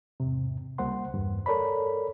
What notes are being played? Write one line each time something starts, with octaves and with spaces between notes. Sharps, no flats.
E2 G#2 C3
C#2 G3 A#3 C5 F#5 C6
E2 G2
A4 A#4 C#5 D5 B5